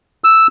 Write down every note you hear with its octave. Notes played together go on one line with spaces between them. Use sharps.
E6